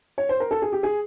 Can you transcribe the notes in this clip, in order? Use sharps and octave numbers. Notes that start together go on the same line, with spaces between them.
C#5
C5
A#4
A4
G#4
G4
G#4